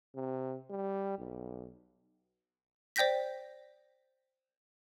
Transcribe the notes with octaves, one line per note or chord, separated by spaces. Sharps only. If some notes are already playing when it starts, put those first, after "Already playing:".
C3
G3
B1
C5 D5 G5 G6 A#6 B6